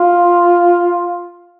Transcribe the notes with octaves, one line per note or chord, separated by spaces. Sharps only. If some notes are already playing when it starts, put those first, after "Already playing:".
Already playing: F4